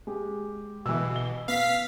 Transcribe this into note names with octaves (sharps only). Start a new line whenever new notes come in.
G#3 G4
B2 E3 E6
G7
B3 F5 B6